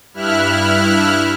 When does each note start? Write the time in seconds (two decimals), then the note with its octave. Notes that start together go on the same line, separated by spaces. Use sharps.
0.14 G2 E4 E5 F6 F#6